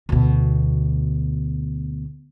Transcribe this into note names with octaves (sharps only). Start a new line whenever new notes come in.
D2 B2